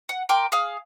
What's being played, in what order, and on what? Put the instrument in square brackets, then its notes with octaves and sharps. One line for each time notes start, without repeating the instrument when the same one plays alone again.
[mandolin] F#5
A#4 G5 C6 D6
G#4 F5